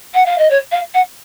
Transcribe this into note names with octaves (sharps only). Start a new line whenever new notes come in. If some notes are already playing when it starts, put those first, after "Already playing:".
F#5
F5
D#5
C#5
F5
F#5